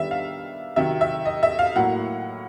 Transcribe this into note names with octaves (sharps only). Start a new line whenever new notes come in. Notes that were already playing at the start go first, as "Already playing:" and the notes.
Already playing: D#3 G3 B3 D4 E5
F5
C3 D#3 F#3 E5
E5
D#5
E5
F5
A2 F#3 A#3 F#5